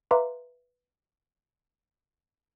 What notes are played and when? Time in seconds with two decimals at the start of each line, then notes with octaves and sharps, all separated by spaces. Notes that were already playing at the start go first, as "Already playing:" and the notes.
0.11 B4 E5 F5 A#5 C6 D6